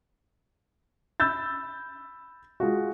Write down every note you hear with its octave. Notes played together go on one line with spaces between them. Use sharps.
B5 E6 G6 A6
G#3 F4 F#4